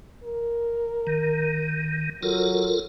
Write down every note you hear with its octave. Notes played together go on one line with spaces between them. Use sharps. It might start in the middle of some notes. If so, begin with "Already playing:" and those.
A#4
D#3
F#3 F4 A4 A#4